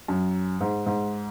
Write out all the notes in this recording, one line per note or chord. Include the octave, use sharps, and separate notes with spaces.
F#2
G#2
G#2